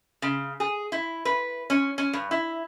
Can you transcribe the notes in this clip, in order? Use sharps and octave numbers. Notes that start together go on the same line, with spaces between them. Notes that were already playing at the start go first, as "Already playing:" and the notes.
C#3
G#4
E4
B4
C#4
C#4
G2
E4